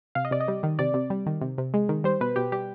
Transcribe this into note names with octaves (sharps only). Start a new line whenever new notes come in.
C3 F5
D#5
C3 D5
D#5
G3
D#3
C3 D5
C3
G3
D#3
C3
C3
G#3
D#3
G3 C5
B2 B4
B2 G4
G3 G4